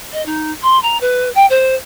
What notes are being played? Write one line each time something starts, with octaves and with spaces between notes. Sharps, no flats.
D#5
D#4
C6
A#5
B4
G5
C5